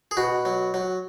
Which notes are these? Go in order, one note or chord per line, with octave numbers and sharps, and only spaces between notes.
G#4
B2 F#4
F#3
F#3